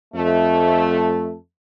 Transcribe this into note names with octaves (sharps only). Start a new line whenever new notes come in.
F2 A3